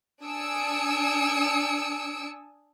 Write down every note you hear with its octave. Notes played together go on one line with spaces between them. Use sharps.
D4 G#5 D#6 E6 C#7 D7